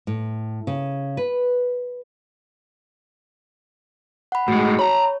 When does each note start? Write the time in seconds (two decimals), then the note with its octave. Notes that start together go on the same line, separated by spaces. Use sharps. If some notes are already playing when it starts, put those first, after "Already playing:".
0.07 A2
0.67 C#3
1.17 B4
4.32 F#5 B5
4.48 A2 G#3 F#4
4.79 C#5 A#5 B5